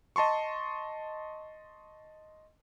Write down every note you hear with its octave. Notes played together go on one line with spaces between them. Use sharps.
D#5 A5 C6 C#6